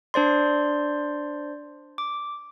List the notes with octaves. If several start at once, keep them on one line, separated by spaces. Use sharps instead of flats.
D4 C5 D5 C6
D6